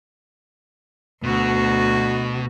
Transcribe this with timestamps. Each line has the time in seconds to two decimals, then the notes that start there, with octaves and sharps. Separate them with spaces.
1.23 D2 B2 F#4